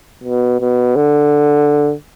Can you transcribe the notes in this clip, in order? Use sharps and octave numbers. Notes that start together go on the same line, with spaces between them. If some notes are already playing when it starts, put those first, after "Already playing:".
B2
B2
D3